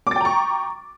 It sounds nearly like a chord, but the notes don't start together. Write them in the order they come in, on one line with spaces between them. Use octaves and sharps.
D6 A6 G5 A#5 C#6